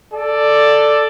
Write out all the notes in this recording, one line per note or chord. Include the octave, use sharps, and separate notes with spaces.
A4 D5